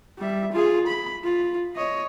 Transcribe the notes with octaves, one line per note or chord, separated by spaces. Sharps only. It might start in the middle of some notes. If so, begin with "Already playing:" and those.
G3 E5
F4 G#4
B5
F4
C#5 D#5